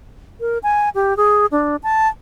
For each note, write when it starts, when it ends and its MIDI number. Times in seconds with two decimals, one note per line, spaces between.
0.40 0.58 70
0.63 0.89 80
0.95 1.16 67
1.17 1.46 68
1.52 1.76 62
1.83 2.08 81